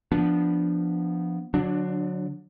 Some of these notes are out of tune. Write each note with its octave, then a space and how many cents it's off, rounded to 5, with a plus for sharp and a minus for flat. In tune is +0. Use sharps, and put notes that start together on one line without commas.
F3 -15 B3 +0 D4 +0
D3 +0 F#3 -20 D4 +25